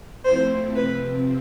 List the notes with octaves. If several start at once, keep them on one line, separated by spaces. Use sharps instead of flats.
F3 A3 C4 E4 C5
C3 F3 C4 B4